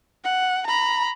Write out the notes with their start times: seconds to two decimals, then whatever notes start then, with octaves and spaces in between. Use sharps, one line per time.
0.24 F#5
0.67 A#5 B5